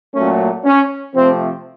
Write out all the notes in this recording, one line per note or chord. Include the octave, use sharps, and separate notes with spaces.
A#2 F#3 A3 C#4
C#4
C3 F3 A3 C4